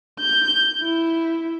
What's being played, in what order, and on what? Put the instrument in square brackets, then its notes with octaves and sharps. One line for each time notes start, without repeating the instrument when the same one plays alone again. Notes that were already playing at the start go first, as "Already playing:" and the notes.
[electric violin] G6
E4